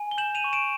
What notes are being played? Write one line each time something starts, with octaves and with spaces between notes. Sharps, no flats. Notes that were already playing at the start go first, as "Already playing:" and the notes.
Already playing: G#5
G7
G6 E7 F#7
D#7 F7
C#6
D7 E7